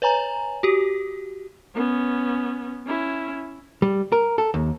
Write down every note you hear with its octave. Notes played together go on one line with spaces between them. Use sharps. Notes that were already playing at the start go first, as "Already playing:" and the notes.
B4 C#5 G#5 A#5
F#4 G4
B3 C#4
C#4 E4
G3
A#4
A4
D#2